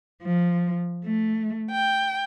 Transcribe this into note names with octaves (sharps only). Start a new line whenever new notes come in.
F3
A3
G5